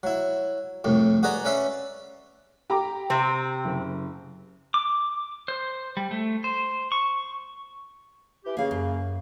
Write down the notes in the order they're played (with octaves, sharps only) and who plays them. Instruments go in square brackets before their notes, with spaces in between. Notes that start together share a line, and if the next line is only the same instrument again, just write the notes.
[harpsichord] F#3 E4
C2 F2 A2
F#4 G#4 B4 D5 D#5 A#5
C#4 B4 D5 E5 C6
[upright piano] G4 A#5 D6
[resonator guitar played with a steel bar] C3 C4
[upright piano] F#1
[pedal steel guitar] D6
C5
G3
A3
C5
C#6
[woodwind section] E3 G4
[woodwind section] C#3 A#3 [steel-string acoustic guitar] G#4 F5
[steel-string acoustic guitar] F#2